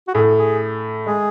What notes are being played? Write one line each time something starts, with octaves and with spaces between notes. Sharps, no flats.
F#4
A2 A3 G#4
G#4
G#3 G#4